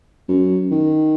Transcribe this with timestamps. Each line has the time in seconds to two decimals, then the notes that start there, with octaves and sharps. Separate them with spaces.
0.28 F#2
0.71 D#3